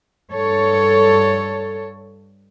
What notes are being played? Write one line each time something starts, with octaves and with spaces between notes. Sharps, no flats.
G2 A4 C#5